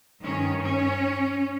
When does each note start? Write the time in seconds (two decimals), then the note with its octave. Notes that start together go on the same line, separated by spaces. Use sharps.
0.20 G2 D#3 C#4
0.61 C#4